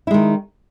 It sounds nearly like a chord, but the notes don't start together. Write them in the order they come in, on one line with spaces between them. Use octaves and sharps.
E4 G#3 D#3